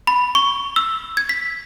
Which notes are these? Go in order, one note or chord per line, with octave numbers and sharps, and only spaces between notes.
B5
C#6
E6
G#6
B6